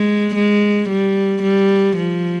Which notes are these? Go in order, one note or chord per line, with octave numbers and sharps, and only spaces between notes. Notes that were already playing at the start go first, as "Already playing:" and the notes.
Already playing: G#3
G#3
G3
G3
F3